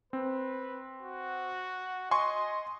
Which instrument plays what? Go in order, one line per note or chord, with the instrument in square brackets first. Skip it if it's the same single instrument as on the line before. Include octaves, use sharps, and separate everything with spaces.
[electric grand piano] C4 [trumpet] B4
[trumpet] F#4
[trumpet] D#5 [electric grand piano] G#5 C6 C#6